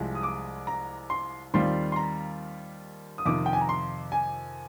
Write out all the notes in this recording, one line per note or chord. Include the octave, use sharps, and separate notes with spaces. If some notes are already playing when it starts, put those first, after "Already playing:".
Already playing: C2 C3 F3 G#3
D#6
D6
A#5
C6
D#2 D#3 G3 C4 F4 C6
C6
A#5
D#6
F2 C3 D#3 D6
G5
G#5
A#5
C6
G#5